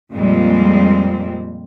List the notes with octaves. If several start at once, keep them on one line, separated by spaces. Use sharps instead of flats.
F2 A#2 G3 G#3 C4